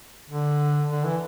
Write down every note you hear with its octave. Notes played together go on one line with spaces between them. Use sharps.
D3
D3
E3